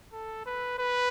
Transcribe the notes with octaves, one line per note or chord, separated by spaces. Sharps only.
A4
B4
B4